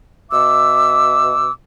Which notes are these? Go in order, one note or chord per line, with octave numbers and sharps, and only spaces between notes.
B2 E5 D6 E6